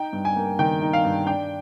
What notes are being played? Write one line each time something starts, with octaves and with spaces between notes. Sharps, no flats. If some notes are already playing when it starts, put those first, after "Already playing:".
Already playing: D#4 G5
G2
G#5
A#3
D#3 G5
D#4
F5
G2
D4 G5